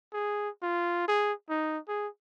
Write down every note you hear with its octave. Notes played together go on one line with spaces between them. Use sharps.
G#4
F4
G#4
D#4
G#4